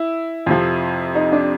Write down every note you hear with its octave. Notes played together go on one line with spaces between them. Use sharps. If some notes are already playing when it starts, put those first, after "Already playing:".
Already playing: E4
F2 C3 F3
D#4
D4